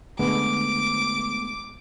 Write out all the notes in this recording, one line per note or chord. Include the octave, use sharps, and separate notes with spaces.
D3 G#3 A3 B3 D6